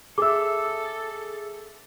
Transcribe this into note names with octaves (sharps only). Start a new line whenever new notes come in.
G#4 A4 E5 D6 E6